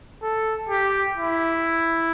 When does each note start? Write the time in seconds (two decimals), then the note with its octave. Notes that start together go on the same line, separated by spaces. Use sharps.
0.23 A4
0.70 G4
1.18 E4